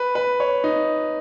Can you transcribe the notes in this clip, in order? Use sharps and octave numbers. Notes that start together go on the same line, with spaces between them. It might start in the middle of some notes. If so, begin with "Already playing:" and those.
Already playing: B4
B4
C#5
D#4